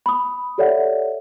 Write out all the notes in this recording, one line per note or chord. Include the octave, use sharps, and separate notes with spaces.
B5 D#6
G4 A4 C#5 D5 E5 F#5